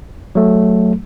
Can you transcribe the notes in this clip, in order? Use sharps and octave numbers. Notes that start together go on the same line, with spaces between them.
F#3 A3